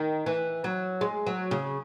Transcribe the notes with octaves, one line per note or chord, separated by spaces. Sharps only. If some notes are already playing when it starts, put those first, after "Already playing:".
Already playing: D#3
E3
F#3
G#3
F#3
C#3